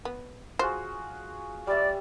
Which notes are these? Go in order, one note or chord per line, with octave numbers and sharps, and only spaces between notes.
B3
F4 F#4 G#4 C5
G3 D5 E5